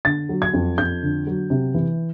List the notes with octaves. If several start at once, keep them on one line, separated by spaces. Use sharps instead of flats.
D3 A6
F#3
G#6
F2
F2 G6
D3
F#3
C3
E3